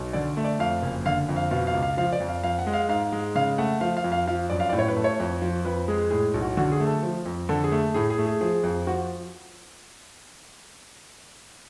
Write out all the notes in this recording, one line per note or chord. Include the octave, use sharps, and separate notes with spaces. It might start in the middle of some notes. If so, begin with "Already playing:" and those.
Already playing: B1
D3 D5
A3
D5
F2 F5
F#1
D3 F5
F2
F5
B2 F5
F5
C#2
F5
F3 F5
D5
F2
F5
F2 F5
F#5
G#3
F5
G#2 F5
G#3
C#3 F5
A3 F#5
F3 F5
F5
F2
F5
F3 F5
F#2 D5
F5
A2 D5
C#5
B4
A3
C#5
F2
F3
F2 B4
G#3 G#4
A2 G#4
B1
F#4
D3 F#4
G#4
A3
A4
F3
F2
D3 A4
G#4
A3
A2 G#4
G#4
A3
G#4
F3 G#4
F2
F3 F#4